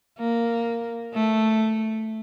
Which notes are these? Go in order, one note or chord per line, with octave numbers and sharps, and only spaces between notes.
A#3
A3